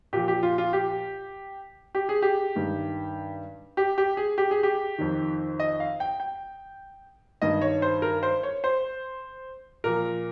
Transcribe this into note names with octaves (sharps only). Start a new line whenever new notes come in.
A#2 F3 G4
G4
F4
F4
G4
G4
G#4
G4
G2 D#3
G4
G4
G#4
G4
G#4
G4
F2 D#3
D#5
F5
G5
G5
G2 D#3 D#5
C#5
C5
A#4
C5
C#5
C5
A#2 F3 A#4